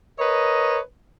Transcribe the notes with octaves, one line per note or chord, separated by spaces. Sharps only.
A#4 B4 C#5 D#5